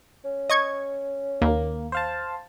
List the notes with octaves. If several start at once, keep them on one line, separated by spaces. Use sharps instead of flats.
C#4
D#5 C#6 G#6
D#2 A#3
C5 F5 A5